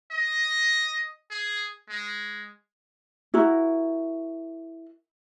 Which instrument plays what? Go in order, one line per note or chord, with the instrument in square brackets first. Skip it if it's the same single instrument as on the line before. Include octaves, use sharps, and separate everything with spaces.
[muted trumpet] D#5
G#4
G#3
[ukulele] E4 F#4 A#4